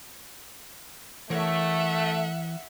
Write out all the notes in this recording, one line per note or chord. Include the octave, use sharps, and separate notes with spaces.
E3 A3 A#4 C#5 E5 F#5